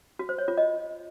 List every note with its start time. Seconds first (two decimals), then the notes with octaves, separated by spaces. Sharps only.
0.19 F#4
0.29 C5
0.38 C#5
0.48 F4
0.57 D#5